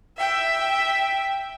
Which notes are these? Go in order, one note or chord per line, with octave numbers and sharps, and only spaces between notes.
E5 G5